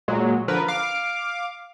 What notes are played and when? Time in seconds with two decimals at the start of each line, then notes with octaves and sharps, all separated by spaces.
0.08 A#2 F#3 G#3
0.48 D3 F3 A#4 B4
0.68 F5 D6